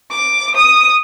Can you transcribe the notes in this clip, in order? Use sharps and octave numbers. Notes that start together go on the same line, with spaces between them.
D6
D#6